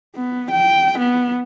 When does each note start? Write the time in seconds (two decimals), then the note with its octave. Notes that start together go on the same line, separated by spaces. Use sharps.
0.15 B3
0.51 G5
0.98 B3